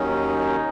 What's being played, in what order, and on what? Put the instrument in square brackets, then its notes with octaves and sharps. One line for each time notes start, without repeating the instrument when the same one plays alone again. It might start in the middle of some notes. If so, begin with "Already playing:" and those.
Already playing: [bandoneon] D#2 D#3 F#3 C#4 [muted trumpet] D#4